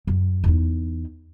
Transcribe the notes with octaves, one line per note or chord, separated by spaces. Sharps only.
F#2
E2 D#4